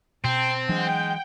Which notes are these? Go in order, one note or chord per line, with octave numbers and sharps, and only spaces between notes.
B2 C4 G5 A5
E3 F#3 G#3 D4 F#5 G5 G6